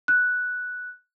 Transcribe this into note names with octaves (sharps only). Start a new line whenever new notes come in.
F#6